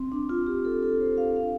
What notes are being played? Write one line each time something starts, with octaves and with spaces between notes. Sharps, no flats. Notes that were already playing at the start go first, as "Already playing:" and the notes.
Already playing: C4
D4
F4
G4
A4
A4
C5
F5
F5